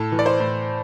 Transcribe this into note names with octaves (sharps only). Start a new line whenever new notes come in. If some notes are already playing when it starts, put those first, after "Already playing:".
Already playing: A2 A4
E3
D5
C5
A2